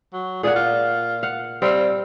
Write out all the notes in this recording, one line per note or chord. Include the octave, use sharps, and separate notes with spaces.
F#3
A#2 G#4 D5 F#5
F4
F5 F#5
G3 C4 F5